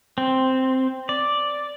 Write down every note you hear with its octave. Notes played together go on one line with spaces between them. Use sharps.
C4
D5